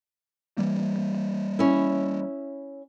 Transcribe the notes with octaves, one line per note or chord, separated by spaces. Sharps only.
E3 G3 A#3
C#4 E4